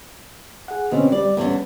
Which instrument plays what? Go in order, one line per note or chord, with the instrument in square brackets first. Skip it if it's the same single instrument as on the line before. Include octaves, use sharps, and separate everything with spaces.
[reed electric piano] G#4 F#5
[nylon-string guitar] B2 [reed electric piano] D3 C4 C#4
[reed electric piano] G3 [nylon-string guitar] D5
[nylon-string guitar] E2 D3 C#4